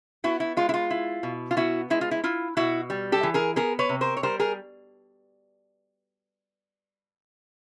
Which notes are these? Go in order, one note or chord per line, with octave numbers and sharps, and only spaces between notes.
B3 E4 F#4
E4
G#3 F4
E4
F4
E4
B2
F4
B3 E4 F#4
G#3 E4
F4
E4
E4 F4
B2 E4 F#4
G3
G4 A4
E3
G#4 A#4
B3 G#4 A#4
B4 C#5
C3
A#4 C5
C#5
G3 A#4 C5
G#4 A#4